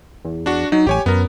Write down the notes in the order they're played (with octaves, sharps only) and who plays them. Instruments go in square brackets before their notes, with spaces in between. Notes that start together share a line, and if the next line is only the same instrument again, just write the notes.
[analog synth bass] E2
[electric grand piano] D4 F#4
[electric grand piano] F#3 [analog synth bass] D#4
[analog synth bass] A1 [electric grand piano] G4 C#5 G#5
[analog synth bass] F#2 [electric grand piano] B3 A#4